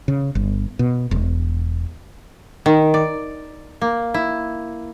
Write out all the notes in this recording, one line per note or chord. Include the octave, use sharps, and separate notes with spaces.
C#3
G1
B2
E1
D#3
D5
A#3
E4